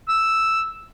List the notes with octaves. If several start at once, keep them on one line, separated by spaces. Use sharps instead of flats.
E6